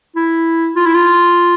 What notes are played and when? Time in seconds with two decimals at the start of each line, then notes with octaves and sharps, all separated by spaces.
0.16 E4
0.76 F4
0.86 E4
0.95 F4